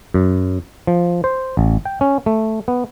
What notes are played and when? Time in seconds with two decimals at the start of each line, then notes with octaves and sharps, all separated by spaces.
0.14 F#2
0.87 F3
1.24 C5
1.57 A1
1.85 G5
2.01 C#4
2.26 A3
2.68 B3